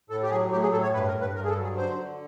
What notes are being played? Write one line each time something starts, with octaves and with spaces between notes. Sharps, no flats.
A2 A4
G4
F#3 G#4
A2 G4
G#4
A2 A4
C#5
G2 B4
A#4
G2
B4
G2 A#4
G#4
A4
F#3
G#4
D3 C5
D3